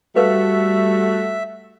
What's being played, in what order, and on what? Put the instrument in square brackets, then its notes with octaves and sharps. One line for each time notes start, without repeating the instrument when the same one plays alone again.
[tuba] G3 [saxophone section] A3 F#4 [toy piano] A4 B4 F5 [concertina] E5